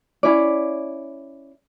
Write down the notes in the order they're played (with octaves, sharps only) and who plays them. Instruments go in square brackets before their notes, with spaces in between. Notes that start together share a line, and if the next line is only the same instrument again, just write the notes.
[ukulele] C#4 E4 D5